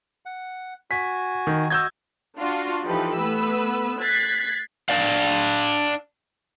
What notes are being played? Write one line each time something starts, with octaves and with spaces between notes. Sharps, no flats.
F#5
F#4 G#5 B6
D#3
F#4 D#5 E6 G6 G#6
D4 F4 F#4
E3 F3 D#4 G4 A4 B4
A3 B3 B4 E6
F#6 G#6 A6 B6 C7
D4 D5 F5